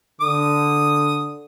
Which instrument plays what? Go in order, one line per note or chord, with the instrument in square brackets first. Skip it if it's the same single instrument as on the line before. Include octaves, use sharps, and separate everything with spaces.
[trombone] D3 [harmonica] D#6